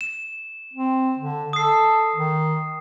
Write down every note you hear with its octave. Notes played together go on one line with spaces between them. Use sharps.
E7
C4
D3
A4 D#6 C7
D#3